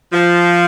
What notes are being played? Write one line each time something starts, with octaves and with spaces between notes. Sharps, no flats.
F3